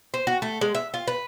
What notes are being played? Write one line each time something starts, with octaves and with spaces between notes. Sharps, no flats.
C5
F#4
A3
G#3
E5
F4
B4